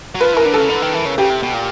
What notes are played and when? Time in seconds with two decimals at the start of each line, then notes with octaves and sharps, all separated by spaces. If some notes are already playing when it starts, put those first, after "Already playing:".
0.15 F#3
0.21 F3 B4
0.34 E3 A#4
0.45 D3
0.54 C#3 A4
0.69 D3
0.82 D#3
0.94 E3
1.05 C#3
1.18 C#3 G4
1.30 C3
1.43 B2
1.54 A#2